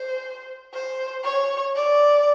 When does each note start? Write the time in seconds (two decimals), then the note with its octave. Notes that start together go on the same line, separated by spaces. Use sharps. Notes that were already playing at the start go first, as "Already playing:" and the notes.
Already playing: C5
0.74 C5
1.24 C#5
1.76 D5